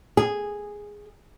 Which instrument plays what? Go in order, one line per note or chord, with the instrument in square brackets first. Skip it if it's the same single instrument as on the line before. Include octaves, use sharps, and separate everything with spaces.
[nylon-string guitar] G#4